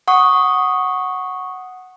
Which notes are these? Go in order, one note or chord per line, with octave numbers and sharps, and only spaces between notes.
F#5 C#6 D#6